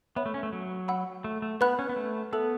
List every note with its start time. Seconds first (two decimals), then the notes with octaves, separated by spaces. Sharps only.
0.16 B3 C#5 E5 B5
0.26 A3
0.34 C#4
0.43 A3
0.53 F#3
0.88 F#5 B5 E6
1.24 A3
1.42 A3
1.61 B3 B4 F#5 B5 F#6
1.79 C#4
1.89 B3
1.96 A3
2.33 B3 A4 E5 A5 E6